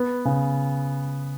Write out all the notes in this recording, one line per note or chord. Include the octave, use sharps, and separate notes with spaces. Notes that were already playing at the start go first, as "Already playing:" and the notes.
Already playing: B3
C#3